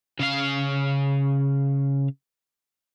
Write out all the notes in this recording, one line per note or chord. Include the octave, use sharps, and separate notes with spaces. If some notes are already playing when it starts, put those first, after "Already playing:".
C#3 F5